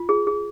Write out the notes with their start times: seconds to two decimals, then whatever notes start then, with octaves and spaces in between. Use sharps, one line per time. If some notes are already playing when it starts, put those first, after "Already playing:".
Already playing: F4
0.09 G#4
0.27 G#4